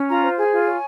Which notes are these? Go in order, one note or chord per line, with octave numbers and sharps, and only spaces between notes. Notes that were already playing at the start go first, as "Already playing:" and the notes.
Already playing: C#4
F4 A#5
C5
G#4 G#5
F4
C#5